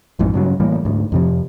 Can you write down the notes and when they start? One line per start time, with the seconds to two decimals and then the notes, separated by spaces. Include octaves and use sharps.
0.19 A1 F2 G#2 B2
0.34 G2 C#3 F#3
0.60 A2 E3 G3 A#3
0.85 D2 G#2
1.12 F2 C3 F3